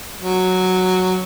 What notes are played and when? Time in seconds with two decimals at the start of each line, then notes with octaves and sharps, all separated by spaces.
0.21 F#3